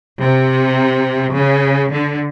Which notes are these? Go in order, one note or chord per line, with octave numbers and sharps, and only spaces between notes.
C3
C#3
D3